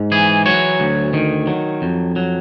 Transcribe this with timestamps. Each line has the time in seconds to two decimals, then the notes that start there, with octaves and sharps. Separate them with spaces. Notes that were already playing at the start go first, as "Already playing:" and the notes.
Already playing: G#2
0.12 E3 G#4
0.46 F#3 C#5
0.80 D2
1.13 D#3
1.47 F#3
1.82 F2
2.16 F#3